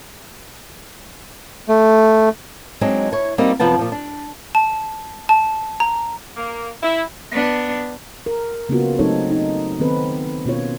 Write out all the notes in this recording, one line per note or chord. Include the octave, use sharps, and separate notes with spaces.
A3
F#3 G#3 C4 D4 D#4
E4 C#5
G3 A#3 C4 D#4 F#4 G4
F#2 C3 F3 B3 F#5 A5
A#2 F3
D4
A5
A5
A#5
A#3
E4
B3 D4
A#4
C#3 A#3 B3 C#4 F4 F#4
F#3 A3 C4 D#4 A4 C#5
D#4
D#3 B3 C4 A4 B4
B2 A#3 C#4 F4 C#5